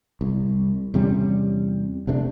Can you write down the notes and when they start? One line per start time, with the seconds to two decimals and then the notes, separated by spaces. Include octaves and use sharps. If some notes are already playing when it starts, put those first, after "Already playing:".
0.21 C2
0.94 E2 C3 G3 C#4
2.07 F1 C3 A3 D4